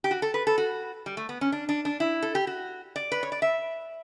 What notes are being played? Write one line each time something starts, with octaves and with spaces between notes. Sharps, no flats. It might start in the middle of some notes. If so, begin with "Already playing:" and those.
G4
F#4
A4
B4
A4
F#4
G3
A3
B3
C#4
D4
D4
D4
E4
A4
G4
F#4
D5
B4
C#5
D5
E5